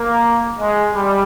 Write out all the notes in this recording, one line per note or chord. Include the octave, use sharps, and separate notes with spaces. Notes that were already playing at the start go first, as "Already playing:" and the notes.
Already playing: A#3
G#3
G3